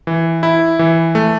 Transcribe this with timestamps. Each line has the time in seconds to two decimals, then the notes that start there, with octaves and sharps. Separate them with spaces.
0.07 E3
0.43 E4
0.79 E3
1.15 A3